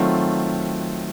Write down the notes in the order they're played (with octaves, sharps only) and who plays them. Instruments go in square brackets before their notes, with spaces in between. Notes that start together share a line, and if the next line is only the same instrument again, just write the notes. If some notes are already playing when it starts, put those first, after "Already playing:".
Already playing: [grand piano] D#3 F#3 A3 C4 F4